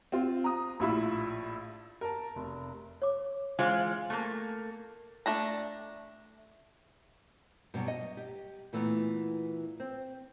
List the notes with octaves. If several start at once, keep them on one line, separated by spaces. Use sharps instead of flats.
C4 F4
A#5 D#6
A#1 A2 E4 F4 B5 E6
A#4 A5
F1
C#5 D6
E3 G#3 F4 G#4 C5 F5
A3 A#3
A3 D4 A#5
G2 B2 D#3 F#3
D#5
G4
A#2 E3 A3 B3
C4